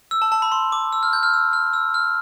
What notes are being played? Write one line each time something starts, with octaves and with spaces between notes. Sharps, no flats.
E6
A5
A5
B5
C6
D6
E6
F6
G6
F6
E6
F6
E6
F6